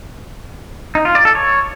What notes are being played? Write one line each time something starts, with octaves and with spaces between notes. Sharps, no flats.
D#4
F4
D5
A4
C#5